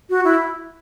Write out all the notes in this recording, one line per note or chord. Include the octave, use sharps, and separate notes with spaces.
F#4
E4